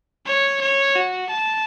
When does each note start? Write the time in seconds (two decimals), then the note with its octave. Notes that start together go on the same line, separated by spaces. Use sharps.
0.26 C#5
0.61 C#5
0.96 F#4
1.31 A5